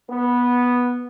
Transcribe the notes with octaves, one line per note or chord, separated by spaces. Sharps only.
B3